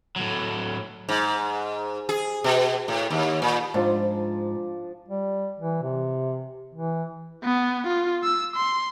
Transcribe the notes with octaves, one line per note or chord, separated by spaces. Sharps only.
A2 F#3
G#2
G#4
B2
A2
D#2
A#2
G#2 F3 D4 A5
G3
E3
C3
E3
B3
F4
E6
C6